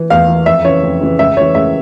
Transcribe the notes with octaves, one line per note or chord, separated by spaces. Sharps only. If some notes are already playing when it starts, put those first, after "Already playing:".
Already playing: E3
E2 F5
E3
F2 E5
C#3 E3 C#5
F2
C#3 E3
C#2 E5
C#3 E3 C#5
C#2 E5